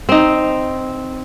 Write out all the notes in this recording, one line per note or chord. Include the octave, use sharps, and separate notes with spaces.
C4 D#4